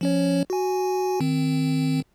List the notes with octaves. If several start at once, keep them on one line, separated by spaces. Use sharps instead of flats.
F3 C#4 C#5
F#4 G#5
D#3 C4